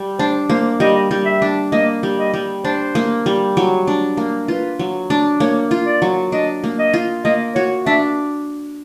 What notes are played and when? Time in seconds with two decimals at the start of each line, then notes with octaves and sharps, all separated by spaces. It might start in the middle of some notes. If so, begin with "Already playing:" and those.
Already playing: G3
0.19 D4 C5
0.50 A#3 C5
0.80 G3 D#5
1.11 G3
1.26 E5
1.42 D4
1.72 A#3 D#5
2.03 G3
2.18 D#5
2.34 G3
2.64 D4 C5
2.95 A#3
3.26 G3
3.57 F#3
3.88 D4
4.17 A#3
4.48 F4 B4
4.79 F#3
5.10 D4
5.40 A#3 C#5
5.71 F4
5.86 D5
6.02 F#3
6.32 D4 D#5
6.64 A#3
6.79 D#5
6.94 F4
7.25 A#3 D#5
7.55 F#4 C#5
7.86 D4 E5